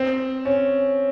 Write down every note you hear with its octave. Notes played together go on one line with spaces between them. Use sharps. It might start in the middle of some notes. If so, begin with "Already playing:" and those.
Already playing: C4
C#4